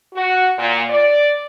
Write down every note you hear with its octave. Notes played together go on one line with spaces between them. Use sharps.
F#4
A#2
D5